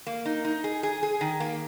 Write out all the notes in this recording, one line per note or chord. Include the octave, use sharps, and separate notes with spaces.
A#3
D#4
D#4
G#4
G#4
G#4
D#3
A#3